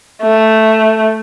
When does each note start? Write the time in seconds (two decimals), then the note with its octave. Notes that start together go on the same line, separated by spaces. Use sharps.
0.22 A3